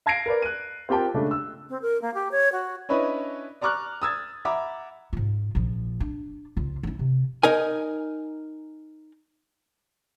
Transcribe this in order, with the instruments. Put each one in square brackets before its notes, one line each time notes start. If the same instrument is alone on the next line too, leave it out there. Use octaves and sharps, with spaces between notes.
[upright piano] F5 A5 G#6 A#6 C7 D7
A#4 B4 D5
F#6 D#7
C4 F4 G4 A#4 G5 A5
C#3 G#3 A3 D4
E6
[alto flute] C4
A#4
A#3
G4
C#5
F#4
[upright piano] C#4 D4 E4 B4 C#5 D#5
D5 A#5 C#6 D6 F6 F#6
D#6 E6 G#6 A6
E5 F#5 A#5 B5 D6
[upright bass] G#2 F4
A#1 F3
D4
C#2 F4
C#4 E4
C3
[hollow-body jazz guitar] D#4 A#4 G#5